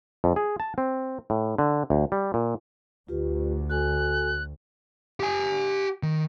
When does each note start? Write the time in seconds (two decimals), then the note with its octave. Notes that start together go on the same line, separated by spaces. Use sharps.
0.24 F2
0.36 G#4
0.60 A5
0.78 C4
1.30 A2
1.58 D3
1.90 D2
2.12 G3
2.34 A#2
3.09 D2 F4 G4 B4
3.70 F#4 A4 G#5 F#6
5.20 G4 G#5
6.03 D#3